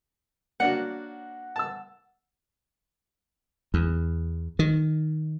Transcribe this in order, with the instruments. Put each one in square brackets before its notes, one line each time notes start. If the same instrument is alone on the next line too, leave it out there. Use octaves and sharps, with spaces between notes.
[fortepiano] A#3 D4 F#4 [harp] F#5
[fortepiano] A5 E6
[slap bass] E2
D#3